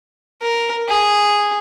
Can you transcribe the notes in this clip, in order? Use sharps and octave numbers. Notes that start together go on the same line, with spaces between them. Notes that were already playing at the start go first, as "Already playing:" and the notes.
A#4
G#4